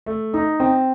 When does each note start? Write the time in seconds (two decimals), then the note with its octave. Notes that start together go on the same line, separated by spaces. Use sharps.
0.06 A3
0.34 D#4
0.60 C4